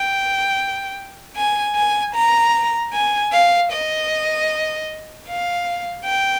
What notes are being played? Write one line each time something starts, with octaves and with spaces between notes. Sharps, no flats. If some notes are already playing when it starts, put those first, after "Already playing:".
Already playing: G5
G#5
G#5
A#5
G#5
F5
D#5
F5
G5